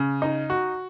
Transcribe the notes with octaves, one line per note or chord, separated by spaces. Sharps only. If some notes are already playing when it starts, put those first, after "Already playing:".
Already playing: C#3
D#4
F#4